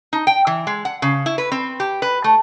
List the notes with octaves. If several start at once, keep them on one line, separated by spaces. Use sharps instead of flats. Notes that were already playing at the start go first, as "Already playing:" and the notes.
D#4
G5
E3
G#3
F#5
C#3
E4
B4
C4
G4
B4
A3